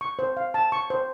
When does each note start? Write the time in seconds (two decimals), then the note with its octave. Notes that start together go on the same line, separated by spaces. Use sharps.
0.01 C#6
0.19 C5
0.37 F5
0.54 A5
0.72 C#6
0.90 C5